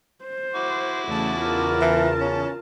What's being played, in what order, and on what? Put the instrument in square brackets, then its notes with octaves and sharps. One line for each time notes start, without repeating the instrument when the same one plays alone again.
[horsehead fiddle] C5
[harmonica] E4 F#4 D6
[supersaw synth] E2 C#3 A5 [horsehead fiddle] A3
[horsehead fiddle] F4 A#4
[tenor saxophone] E3
C#4